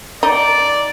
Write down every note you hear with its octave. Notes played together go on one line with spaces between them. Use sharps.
D#4 D5